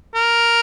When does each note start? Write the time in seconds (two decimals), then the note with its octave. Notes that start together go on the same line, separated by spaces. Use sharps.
0.14 A#4